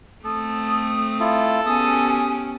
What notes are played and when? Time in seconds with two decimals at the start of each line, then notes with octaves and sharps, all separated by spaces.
0.25 A3 C4 A4 D#6
1.20 E4 F4 A4
1.66 B3 C#4 G4 G#4 G#5 D#6